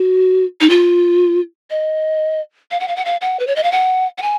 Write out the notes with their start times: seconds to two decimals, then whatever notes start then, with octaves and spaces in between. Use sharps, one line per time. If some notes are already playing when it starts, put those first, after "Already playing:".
Already playing: F#4
0.60 D#4
0.69 F4
1.70 D#5
2.71 F5
2.80 F#5
2.88 F5
2.96 F#5
3.05 F5
3.21 F#5
3.39 B4
3.47 C#5
3.56 D#5
3.63 F5
3.72 F#5
4.18 F#5
4.22 G#5